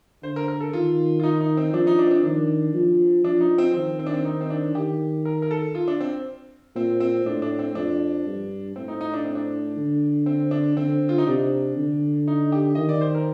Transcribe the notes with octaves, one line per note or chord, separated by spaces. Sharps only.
D3 C5
A#4
A#4
A4
D#3 F4
F4
D#4
D#4
C4
F3 D4
D#4
D4
C4
D4
D#3 D4
F3
F3 D4
D#4
C4
D#3 C4
C4
D4
C4
D#4
C4
D4
D#3 G4
A#4
A#4
A4
F4
D4
C4
A#2 C4
C4
A2 D4
D4
C4
F2 D4
G2
A2 C4
D#4
D#4
D4
C4
D4
D3
C4
D4
D3 C4
F4
D#4
C3 D4
D3
D#4
G4
D#3 D#5
D5
C5
A#4